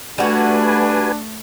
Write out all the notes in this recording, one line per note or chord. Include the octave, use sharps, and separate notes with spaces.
G3 A3 D4 F#4 B4 G#5